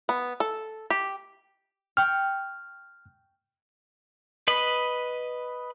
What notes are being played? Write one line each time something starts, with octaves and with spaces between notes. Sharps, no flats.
B3
A4
G4
G5 C#6 F6
B4 D#5 B5